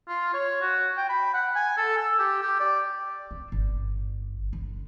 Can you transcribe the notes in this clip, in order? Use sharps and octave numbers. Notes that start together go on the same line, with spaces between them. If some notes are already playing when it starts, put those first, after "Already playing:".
F4
C#5
F#4
G5
B5
F#5
G#5
A4
E6
G4
G4
D5
C4
G1
D3